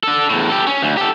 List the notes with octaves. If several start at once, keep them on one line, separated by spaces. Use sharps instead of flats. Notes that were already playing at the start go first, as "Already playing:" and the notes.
D4 A4
E2 A2
G4 A4
C#4
D2
G4 A4